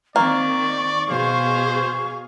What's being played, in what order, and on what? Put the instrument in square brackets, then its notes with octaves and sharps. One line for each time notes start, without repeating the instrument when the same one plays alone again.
[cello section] D#3 C4 [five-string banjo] A#3 [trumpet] D5 [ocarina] C#6
[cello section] B2 G#4 F5 [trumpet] C5